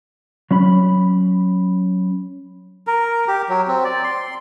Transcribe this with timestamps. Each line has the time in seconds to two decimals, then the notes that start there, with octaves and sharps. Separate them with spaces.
0.51 F#3 C#4 B5
2.87 A#4
3.28 G4
3.49 F#3
3.68 C4
3.85 D5
4.04 C6